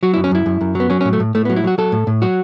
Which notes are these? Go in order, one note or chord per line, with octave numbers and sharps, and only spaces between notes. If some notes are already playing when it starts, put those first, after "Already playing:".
F#3 F#4
E4
F#2
C#4
F#2 E4
F#2
F#2
F#3 B3
F#3 C#4
C#4
A2
A3
A2
A2 A3
B3
F#3
E4
F#3 F#4
F#3 A4
A2
A2
F#3 F#4